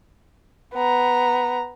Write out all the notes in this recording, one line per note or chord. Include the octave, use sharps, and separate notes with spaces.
B3 A#5